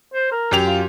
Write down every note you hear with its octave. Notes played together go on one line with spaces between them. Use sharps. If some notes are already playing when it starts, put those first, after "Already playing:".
C5
A#4
F#2 G4 F7
F4